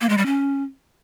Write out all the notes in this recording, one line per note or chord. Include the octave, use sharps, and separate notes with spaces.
A#3
G#3
G3
C#4